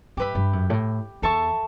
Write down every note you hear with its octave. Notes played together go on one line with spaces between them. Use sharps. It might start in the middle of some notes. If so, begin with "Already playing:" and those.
G2 G4 B4 E5 B5
G2
F#2
A2
E2 A4 E5 A5 C#6